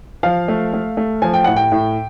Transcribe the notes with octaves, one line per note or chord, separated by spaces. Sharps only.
F3 F5
A3
A3
A3
F3 G#5
G5
A2 F#5
G5
A2